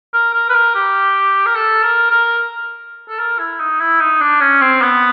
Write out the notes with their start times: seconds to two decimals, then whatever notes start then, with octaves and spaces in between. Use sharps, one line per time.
0.13 A#4
0.34 A#4
0.49 B4
0.54 A#4
0.75 G4
1.46 A#4
1.55 A4
1.83 A#4
2.10 A#4
3.08 A4
3.19 A#4
3.39 E4
3.60 D#4
3.80 E4
4.00 D#4
4.20 D4
4.40 C#4
4.61 C4
4.82 B3